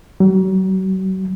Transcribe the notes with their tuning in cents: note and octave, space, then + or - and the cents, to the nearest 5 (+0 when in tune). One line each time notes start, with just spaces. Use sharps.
F#3 +35